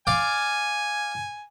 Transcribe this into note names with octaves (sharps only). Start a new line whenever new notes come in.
D5 F5 G#5 D6